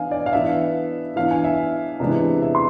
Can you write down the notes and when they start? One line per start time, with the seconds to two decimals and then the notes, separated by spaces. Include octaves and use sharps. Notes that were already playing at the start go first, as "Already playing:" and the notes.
Already playing: E3 B3 D4 F5 G#5
0.11 D5
0.26 F5
0.33 E3 B3 D4 E5
1.16 E3 B3 D4 F5
1.31 G#5
1.44 E5
2.00 C3 E3 G#3 B3 D4
2.42 E5
2.55 C6